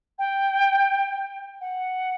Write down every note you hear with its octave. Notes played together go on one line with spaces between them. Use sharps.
G5
F#5